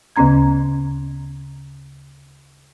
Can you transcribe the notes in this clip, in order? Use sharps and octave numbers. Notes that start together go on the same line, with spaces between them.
D2 C#3 B3 C#4 A#5 G#6